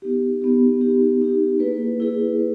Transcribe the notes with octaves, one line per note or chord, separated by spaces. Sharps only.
B3 D#4 G4
B3 D#4 G4
B3 D#4 G4
B3 D#4 G4
A#3 E4 G#4 B4
A#3 E4 G#4 B4
B4